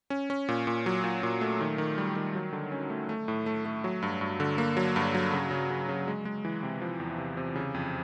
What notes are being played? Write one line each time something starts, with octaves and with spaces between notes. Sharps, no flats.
C#4
C#4
A#2
A#2
F#3
A#2
A#2
A3
D#3
D#3
G3
D#3
F#3
D3
C#4
A3
A3
A2
A3
A3
F#3
G2
G2
D3
A#3
F#3
G2
F#3
C#3
C#3
C#3
C#3
G#3
G#3
E3
C3
F3
E2
C3
C3
C#3
F2